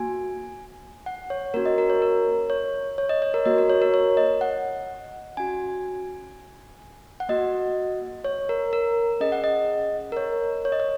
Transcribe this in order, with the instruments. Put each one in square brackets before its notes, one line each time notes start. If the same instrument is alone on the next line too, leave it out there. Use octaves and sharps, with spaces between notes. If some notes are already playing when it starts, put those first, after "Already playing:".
Already playing: [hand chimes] A#3 F#4 G#5
F#5
C#5
A#3 C#4 F#4 A#4
D#5
A#4
C#5
A#4
C#5
C#5
D#5
C#5
A#4
A#3 F#4 D#5
A#4
C#5
A#4
C#5
D#5
F#5
C#4 F#4 G#5
F#5
A#3 F#4 D#5
C#5
A#4
A#4
C#4 G#4 D#5
F#5
D#5
A#4
C#5
C#5
D#5
C#5